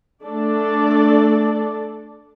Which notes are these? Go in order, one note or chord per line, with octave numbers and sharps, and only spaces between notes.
A3 D4 A4 D5